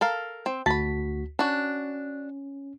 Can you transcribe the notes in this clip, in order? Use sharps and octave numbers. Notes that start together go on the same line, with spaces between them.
A4 A#4 F5
C4
D2 F#4 A5 B5 B6
C#4 D4 F#4